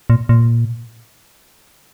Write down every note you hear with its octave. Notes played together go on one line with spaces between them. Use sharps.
A#2
A#2